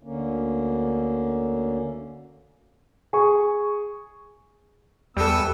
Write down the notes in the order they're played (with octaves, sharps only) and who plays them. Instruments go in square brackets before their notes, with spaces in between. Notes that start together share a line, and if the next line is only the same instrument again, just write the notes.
[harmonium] D2 D3 A#3 C#4
[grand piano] G#4 C#6
[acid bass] E2 [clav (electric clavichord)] G3 A4 [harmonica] B3 E6